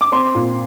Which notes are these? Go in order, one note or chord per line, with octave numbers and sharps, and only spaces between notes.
D6
C4 C6
A#2